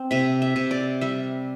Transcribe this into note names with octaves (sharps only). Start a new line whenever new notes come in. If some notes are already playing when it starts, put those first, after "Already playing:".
Already playing: C4
C3 E5
E5
C3
D5
G3 E5